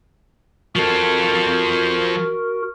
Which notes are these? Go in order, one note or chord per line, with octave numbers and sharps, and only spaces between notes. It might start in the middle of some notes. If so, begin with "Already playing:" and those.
F3 F#4 A4 A#4